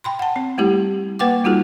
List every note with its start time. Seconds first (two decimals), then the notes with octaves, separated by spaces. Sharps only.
0.04 G5 B5 C6
0.19 F#5 A5
0.36 C4
0.58 G3 A3 E4 G4
1.19 A#3 B4 F#5 G5 D6
1.44 G3 D#4 F4 F#4 G#4